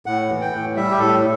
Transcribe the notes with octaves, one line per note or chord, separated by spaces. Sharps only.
A2 F#5
E3
G5
A2
G3 E5
G4
A2 A4